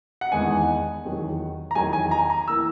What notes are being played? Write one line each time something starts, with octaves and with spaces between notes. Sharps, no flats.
F#5
E2 D#3 G#3 B3 D#4 G#5
E2 D#3 F#3
A#5
E2 D#3 F#3 G#5
G#5
A#5
A#5
E3 A#3 E6